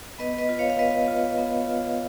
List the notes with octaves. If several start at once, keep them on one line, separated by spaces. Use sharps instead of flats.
B3 B4 D#5
B4 D#5
F4
C#5 F5
F5
B3 B4 D#5
F4
B3
F4